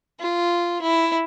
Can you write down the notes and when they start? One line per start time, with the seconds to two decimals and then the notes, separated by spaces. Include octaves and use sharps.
0.20 F4
0.82 E4